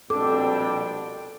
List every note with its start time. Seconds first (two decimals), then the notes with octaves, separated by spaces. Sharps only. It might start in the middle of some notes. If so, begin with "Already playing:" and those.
0.10 A#1 B2 G3 C4 D4 A4 G5 D6